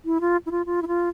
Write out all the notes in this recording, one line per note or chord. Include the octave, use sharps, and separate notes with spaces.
E4
F4
E4
F4
F4
E4
F4